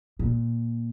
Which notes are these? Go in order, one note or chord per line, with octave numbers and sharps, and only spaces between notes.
A#2